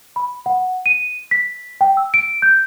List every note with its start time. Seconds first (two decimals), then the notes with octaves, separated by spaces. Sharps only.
0.16 B5
0.46 F#5
0.86 D#7
1.31 B6
1.81 G5
1.97 E6
2.14 D7
2.42 G6